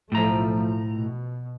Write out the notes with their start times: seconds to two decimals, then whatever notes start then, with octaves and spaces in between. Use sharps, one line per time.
0.12 B1 A2 F3 A3 A#5
0.93 B2